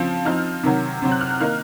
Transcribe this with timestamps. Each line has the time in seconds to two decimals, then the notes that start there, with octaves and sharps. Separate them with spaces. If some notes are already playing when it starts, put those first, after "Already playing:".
Already playing: C#3 F3 C4
0.25 F3 C4 D#4 F6
0.63 C3 D#3 F#3
1.02 C3 F#3 C4
1.11 F#6
1.21 F6
1.30 F#6
1.40 D#3 A#3 D#4 F6